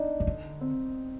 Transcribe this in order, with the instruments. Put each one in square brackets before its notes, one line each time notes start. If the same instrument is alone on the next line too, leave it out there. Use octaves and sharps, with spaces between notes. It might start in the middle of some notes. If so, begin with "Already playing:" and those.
Already playing: [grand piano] D4 D#4
[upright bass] D#3
D3
[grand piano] C4